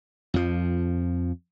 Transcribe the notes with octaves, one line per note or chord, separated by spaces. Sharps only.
F2 F3